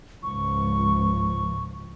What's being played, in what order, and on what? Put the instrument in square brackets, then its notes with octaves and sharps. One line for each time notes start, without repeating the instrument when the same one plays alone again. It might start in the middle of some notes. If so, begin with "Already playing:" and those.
[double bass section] C#2 G#2 F3 [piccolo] C#6